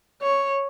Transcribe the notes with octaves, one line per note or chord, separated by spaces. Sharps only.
C#5